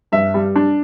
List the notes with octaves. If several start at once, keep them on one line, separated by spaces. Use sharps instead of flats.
G2 E5
G3
D4